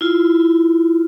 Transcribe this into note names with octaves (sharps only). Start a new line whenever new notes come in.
E4 F4